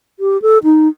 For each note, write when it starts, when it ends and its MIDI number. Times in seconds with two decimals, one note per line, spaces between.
0.20 0.41 67
0.42 0.58 69
0.64 0.88 63